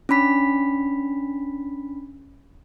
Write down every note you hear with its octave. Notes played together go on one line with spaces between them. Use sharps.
C#4 D4 B5 B6